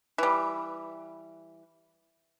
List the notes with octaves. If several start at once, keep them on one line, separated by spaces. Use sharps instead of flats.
E3 G3